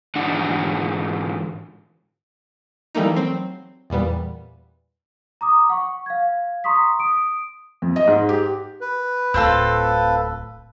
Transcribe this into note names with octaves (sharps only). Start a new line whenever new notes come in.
G#2 D3 E3 D4 F#5
E3 G3 A3 A#3 D#4
F#3 C4
E2 A#2 G3 B3
A#5 D6 D#6
F#5 C#6
F5 G#6
A#5 C6 C#6 D#6 B6
D#6 D7
F2
D#5
G#2
G4
B4
D1 C4 F4 A4